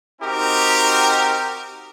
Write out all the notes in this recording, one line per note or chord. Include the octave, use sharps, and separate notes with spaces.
C4 D#4 F#4 G4 A#4